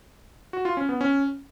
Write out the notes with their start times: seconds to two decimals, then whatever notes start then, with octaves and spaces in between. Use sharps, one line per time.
0.53 F#4
0.65 F4
0.77 C#4
0.89 B3
1.01 C#4